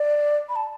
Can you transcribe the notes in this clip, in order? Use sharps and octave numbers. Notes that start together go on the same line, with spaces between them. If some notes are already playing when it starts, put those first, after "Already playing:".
Already playing: D5
B5
A5